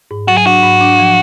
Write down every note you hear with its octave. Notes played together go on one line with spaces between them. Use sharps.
G#2
F#3 F#4
G#4
D4 F#4
G#2
D4
F3